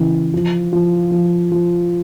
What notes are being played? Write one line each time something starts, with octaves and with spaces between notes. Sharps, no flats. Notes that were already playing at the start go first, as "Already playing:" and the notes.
Already playing: C#3 E3
F3
F3
F3
F3